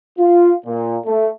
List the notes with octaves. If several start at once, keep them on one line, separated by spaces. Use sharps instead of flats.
F4
A#2
A3